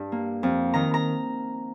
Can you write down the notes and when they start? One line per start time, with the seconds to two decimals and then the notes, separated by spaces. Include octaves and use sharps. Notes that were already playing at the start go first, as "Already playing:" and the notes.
Already playing: G2 G3
0.12 A#3
0.43 F2
0.74 D#3 A#5
0.94 A#5